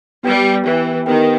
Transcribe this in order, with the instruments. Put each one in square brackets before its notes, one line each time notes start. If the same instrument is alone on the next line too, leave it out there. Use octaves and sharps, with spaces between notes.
[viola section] G3 [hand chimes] B3 G4 B4 G5
[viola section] E3
[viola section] D#3 [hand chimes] B3 G4 B4 G5